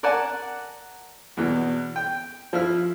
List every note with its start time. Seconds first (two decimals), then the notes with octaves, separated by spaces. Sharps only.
0.03 A#4 D5 F#5 G#5 A5
1.37 E2 B2 E3
1.96 G5
2.53 F3 E4 F6